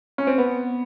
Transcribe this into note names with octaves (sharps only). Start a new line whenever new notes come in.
C#4
C4
B3